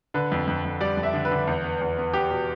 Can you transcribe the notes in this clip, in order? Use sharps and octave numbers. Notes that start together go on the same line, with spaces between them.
D3 B4
F2
F2
F2
G3 D5
F2
E5
D3
B4
D3
E2
B3
E2
B3
B3 G4
B2